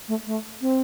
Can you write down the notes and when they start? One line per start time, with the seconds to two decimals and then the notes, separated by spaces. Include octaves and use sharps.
0.08 A3
0.27 A3
0.61 C4